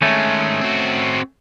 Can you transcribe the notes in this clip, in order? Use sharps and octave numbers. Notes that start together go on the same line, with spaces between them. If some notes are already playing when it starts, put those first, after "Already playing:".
D#3 G#3 A3 C#4
C4 F#4